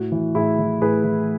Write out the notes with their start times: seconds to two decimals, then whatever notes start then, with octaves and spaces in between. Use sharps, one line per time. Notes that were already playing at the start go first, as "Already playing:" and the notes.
Already playing: A2 F#4
0.12 E3
0.35 A2 E4 G#4
0.59 E3
0.82 A2 G#4 B4
1.04 E3